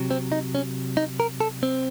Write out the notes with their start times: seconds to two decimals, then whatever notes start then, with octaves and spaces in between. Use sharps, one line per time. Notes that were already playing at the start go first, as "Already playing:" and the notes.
Already playing: C3 F#3
0.11 C4
0.32 D#4
0.55 C#4
0.97 D#4
1.20 A#4
1.40 A4
1.63 C4